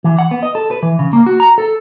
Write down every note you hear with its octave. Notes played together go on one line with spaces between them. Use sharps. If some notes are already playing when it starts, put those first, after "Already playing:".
E3
F#5
B3
D#5
A4
B4
E3
C#3
A#3
F#4
A#5
A4